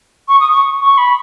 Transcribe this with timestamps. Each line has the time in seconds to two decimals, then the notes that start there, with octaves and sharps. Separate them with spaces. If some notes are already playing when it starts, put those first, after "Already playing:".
0.28 C#6
0.40 D#6
0.51 C#6
0.81 C#6
0.98 B5